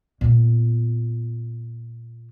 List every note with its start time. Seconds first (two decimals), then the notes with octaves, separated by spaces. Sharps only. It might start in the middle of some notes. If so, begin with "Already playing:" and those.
0.21 A#2 B3